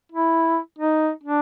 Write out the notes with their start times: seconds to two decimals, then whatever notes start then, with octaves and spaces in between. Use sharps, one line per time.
0.12 E4
0.78 D#4
1.23 D4